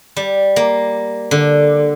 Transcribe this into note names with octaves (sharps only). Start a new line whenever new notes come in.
G3
A#3
D3